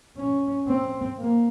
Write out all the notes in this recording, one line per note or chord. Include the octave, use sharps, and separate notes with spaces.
C#4
C4
A#3